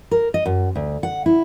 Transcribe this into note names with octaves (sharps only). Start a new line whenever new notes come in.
A#4
D#5
F#2
D2
F#5
E4